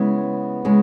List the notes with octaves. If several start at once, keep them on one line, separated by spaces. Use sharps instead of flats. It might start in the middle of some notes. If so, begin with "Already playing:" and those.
Already playing: C#3 G#3 B3 C#4 E4 G#4
C#3 G#3 C#4 E4 G#4